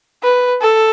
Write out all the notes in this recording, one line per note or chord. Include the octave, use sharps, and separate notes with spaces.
B4
A4